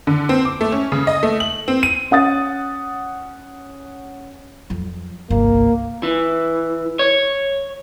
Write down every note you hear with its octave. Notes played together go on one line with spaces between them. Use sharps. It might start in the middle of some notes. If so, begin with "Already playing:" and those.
D3
C4
D6
A3
C#4
C#3
D#5
A3
F#7
C4
D#7
C#4 F#5 D#6 A6
F2 F#3
G1 C2 A#3
E3
C#5